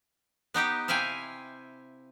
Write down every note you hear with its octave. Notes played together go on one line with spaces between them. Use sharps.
B3 D#4 G4 G5
C3 E4 F5 G5 G#5